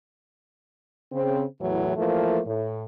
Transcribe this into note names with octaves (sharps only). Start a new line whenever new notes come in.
C#3 C4
E2 A2 E3 F#3
E3 F3 A3 A#3
A2